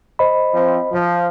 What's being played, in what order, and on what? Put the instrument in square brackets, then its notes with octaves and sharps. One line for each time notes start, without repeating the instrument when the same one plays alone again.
[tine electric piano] C5 D#5 B5
[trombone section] F3 C4
F3